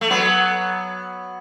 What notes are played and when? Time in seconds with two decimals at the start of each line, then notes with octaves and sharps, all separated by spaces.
0.01 A3
0.10 F#3 B3